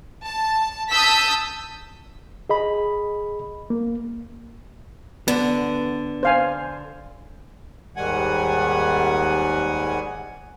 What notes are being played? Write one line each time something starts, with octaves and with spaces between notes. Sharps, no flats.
A5
A5 D#6 E6 G6 B6
G#4 D#5 B5
A#3
D3 B3
C5 F5 G#5
D#2 G#2 D#3 G3 F#5 G#5